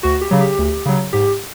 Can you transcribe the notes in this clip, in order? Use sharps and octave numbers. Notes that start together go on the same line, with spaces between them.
D2 F#4
G4
C#3 F#3
G4
D2
C#3 F#3
G#2 G4